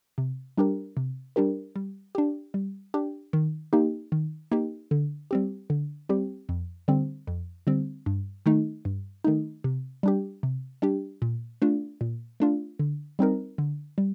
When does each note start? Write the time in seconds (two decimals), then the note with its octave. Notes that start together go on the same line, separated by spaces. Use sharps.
0.18 C3
0.57 G3 D4 G4 A#4
0.97 C3
1.36 G3 D4 G4 A#4
1.76 G3
2.15 D4 G4
2.54 G3
2.94 D4 G4
3.33 D#3
3.73 A#3 D#4 G4
4.12 D#3
4.52 A#3 D#4 G4
4.91 D3
5.31 G3 C4 G4
5.70 D3
6.09 G3 C4 G4
6.49 F2
6.88 D3 G3 C4
7.27 F2
7.67 D3 G3 C4
8.06 G2
8.46 D#3 A3 D#4
8.85 G2
9.24 D#3 A3 D#4
9.64 C3
10.03 G3 D4 G4
10.43 C3
10.82 G3 D4 G4
11.22 A#2
11.62 A3 D4 F4
12.01 A#2
12.40 A3 D4 F4
12.79 D3
13.19 G3 C4 D#4 A#4
13.58 D3
13.98 G3